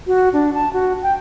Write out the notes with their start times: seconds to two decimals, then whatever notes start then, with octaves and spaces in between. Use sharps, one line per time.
0.07 F#4
0.33 D4
0.54 A5
0.73 F#4
1.03 G5